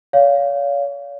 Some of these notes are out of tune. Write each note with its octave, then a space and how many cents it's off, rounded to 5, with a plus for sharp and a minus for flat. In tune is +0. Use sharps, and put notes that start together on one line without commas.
C#5 +40 F5 +0